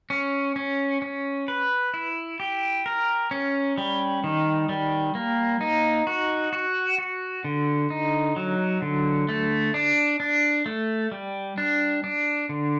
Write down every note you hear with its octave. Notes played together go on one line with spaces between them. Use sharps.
C#4
C#4
C#4
B4
E4
G4
A#4
C#4
G3
D#3
G3
A#3
D#4
F#4
F#4
F#4
D3
D#4
F#3
D3
A3
D4
D4
A3
G3
D4
D4
D3